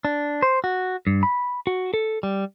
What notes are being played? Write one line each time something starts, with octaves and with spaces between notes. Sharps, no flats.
D4
C5
F#4
G2
B5
F#4
A4
G3